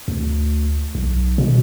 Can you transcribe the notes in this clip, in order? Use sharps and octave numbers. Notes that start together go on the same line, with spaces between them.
D2
B1
B2